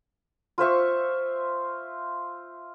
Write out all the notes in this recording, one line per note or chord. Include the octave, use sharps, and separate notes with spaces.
F4 C5 E5 C#6